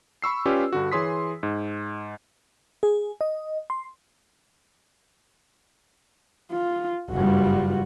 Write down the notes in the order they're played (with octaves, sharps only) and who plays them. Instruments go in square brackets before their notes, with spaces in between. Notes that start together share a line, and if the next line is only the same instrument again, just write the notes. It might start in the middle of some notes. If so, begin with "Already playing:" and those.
[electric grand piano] B5 C#6 E6 C7
C#4 F4 G4 B4 D5
G2 D3 F#4
E3 G#4 C#5 C6 D#6 B6
G#2
[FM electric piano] G#4
D#5
C6
[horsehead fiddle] F4
[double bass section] F#1 G2 G3 [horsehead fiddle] F4 F#4